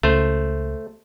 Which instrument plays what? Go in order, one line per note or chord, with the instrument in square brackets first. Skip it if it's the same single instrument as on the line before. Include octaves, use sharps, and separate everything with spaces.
[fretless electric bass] C#2 [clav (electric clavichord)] A3 C5